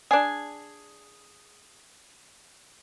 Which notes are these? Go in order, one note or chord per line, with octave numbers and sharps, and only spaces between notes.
D4 G#4